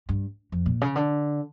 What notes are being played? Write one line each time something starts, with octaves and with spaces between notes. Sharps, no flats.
G2
F2
A#2
C#3
D3